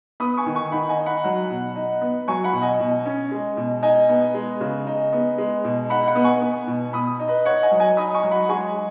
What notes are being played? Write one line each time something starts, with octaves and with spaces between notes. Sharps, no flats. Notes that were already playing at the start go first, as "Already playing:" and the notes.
B3 B5 D#6
G#5 C#6
D#3
G#5 C#6
D#3 F#5 B5
D#5 G#5
D#4
F#5 B5
F#3
B2
D#4
B3
F#3 G#5 C#6
F#5 B5
B2
D#5 G#5
B2
C#4
G#3
B2
D#4 D#5 G#5
B3
G#3
C#3
D#4
B3
G#3
B2
D#4 F#5 B5
F#5 B5
B3
G#5 C#6
B3
B2
B2 B5 D#6
D#4
B4 D#5
D#4 C#5 F#5
D#5 G#5
F#3
D#5 G#5
D#4 B5 D#6
G#5 C#6
F#3
F#5 B5
G#3 G#5 C#6